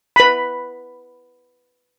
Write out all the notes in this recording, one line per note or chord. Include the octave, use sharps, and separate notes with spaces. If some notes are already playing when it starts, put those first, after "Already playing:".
B4 B5